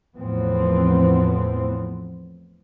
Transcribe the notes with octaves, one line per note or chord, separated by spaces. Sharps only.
E2 A2 F3 B3 C4